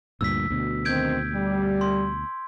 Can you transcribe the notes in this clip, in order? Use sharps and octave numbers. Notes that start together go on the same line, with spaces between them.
D2 G2 A#2 E6 B6
D2 B2
D#3 C4 G6 G#6 D7
G3
C6